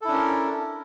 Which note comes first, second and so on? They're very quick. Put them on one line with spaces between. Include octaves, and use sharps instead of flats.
A4 E4 D4 C#4 A#4